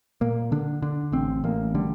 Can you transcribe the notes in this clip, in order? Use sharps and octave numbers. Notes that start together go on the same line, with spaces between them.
A#2 A#3
D3 D4
D3 D4
A1 C4
A1 A#3
D3 G3